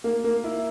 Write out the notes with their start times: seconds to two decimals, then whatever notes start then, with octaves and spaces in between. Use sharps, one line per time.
0.04 A#3
0.24 A#3
0.44 E4